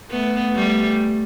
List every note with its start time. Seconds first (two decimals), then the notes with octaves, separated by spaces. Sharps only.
0.10 A3 B3
0.55 G3 A3